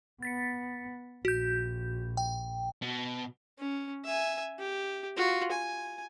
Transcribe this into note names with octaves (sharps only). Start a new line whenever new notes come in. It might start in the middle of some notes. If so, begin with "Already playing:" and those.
B3 A6 B6 C#7
A#1 F#4 G6
G5
B2
C#4
E5 G#5
G4
F4 F#4
G#5